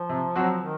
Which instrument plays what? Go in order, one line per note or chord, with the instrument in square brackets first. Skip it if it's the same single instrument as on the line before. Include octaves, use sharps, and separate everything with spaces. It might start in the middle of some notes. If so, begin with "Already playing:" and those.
Already playing: [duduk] F3
[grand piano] C3
F#3 C4 F#4
[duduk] D#3